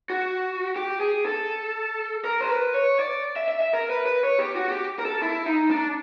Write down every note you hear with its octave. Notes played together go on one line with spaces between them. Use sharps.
F#4
G4
G#4
A4
A#4
C5
B4
C#5
D5
E5
E5
E5
A#4
B4
B4
C#5
G4
F#4
F#4
G4
A#4
A4
E4
D#4
D4